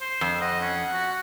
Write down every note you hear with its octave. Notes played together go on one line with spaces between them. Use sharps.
C5
F2
D#5 F#5
C#4
F#4